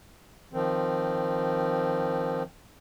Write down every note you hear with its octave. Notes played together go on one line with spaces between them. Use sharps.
D#3 F3 C4